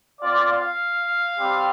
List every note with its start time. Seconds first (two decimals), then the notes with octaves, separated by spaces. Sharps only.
0.21 C4 F4 D5
0.51 F5
1.38 G3 C4 G4